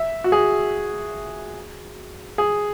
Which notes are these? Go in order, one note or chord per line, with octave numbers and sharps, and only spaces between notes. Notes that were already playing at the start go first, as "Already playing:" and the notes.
Already playing: E5
F#4
G#4
G#4